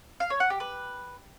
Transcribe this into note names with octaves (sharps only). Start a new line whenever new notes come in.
F5
C#5
F#5
G4
B4